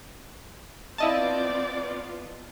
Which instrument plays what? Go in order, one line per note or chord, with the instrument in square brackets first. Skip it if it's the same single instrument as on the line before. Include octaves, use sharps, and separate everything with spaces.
[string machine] B3 F4 [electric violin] C4 D5 [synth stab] E4 D#5 A5 [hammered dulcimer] F5